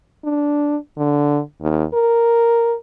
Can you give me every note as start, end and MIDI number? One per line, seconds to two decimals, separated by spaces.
0.24 0.76 62
0.98 1.40 50
1.61 1.84 39
1.94 2.75 70